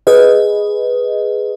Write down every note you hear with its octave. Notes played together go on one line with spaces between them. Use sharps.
G#4 B4 D#5